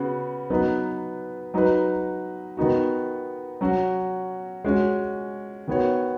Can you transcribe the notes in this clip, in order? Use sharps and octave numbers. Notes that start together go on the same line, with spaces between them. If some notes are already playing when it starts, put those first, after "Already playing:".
Already playing: C#3 B3 F#4
F#3 B3 D#4 B4
F#3 D#4 B4
D#3 B3 D#4 F#4
F#3 C#4 F#4
G#3 C#4 F#4
D#3 B3 F#4 C#5